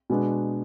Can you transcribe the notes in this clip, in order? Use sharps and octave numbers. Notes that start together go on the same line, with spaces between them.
B2 G#3 B3 D4